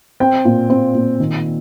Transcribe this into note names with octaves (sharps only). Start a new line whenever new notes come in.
C4 G5
A#2
C4
A#2
D#3